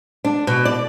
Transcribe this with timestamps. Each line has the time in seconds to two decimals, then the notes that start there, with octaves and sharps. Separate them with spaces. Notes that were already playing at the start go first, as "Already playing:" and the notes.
0.25 D4
0.47 B2
0.65 D5